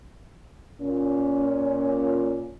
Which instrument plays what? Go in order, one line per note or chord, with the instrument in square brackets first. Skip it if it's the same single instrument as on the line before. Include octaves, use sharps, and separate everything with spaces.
[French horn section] A#2 C#4